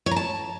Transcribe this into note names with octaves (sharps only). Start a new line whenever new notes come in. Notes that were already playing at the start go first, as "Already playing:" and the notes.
C#5
A#5
A5